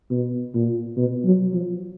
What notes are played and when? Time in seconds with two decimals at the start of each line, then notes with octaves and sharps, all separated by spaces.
0.11 B2
0.54 A#2
0.97 B2
1.25 F#3
1.53 F3